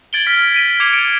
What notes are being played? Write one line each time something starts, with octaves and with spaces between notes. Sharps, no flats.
G#6 A6 D7 F#7 G7
F6 B6
B6 D7 D#7
D6 G#6 C7 C#7 F7
D7